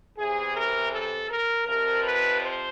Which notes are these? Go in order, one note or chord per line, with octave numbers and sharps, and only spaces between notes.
E2 C3 E3 G#4
A#4
A4
A#4
F2 C3 F3 A#4
B4
C5